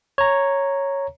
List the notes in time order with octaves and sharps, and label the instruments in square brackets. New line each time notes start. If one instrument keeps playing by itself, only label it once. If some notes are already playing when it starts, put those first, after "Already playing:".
[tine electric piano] C#5 A#5